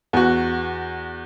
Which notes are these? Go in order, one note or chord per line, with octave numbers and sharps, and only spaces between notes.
E2 F#4